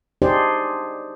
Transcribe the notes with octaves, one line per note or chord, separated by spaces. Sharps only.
D4 D#4 G4 G#4 C5 D5